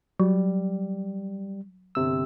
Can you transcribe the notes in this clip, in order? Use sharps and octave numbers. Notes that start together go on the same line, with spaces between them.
F#3 G3
G1 C3 E6